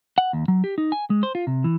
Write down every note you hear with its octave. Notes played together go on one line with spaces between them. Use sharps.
F#5
D#2
F#3
G4
D#4
G#5
G#3
C5
F4
C3
E3